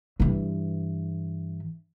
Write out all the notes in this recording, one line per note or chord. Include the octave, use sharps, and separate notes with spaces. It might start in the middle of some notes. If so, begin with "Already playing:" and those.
G2 E3